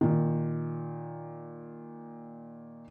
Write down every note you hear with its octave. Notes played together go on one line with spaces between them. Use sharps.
A#2 D#3